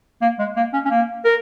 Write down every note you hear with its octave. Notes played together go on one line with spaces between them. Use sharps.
A#3
G#3
A#3
C#4
C#4
A#3
A#4